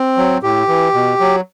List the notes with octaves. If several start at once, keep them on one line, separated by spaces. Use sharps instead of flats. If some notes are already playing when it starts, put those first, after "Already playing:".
Already playing: C4
F#3
A2 G4
E3
B2
F#3